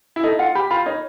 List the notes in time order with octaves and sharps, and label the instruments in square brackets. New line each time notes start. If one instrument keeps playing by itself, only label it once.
[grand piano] E4
[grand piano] D#4 [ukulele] A4
[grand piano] F4 [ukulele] F#5
[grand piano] G4 [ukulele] B5
[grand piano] F4 [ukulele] B5
[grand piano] D#4 [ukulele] C#5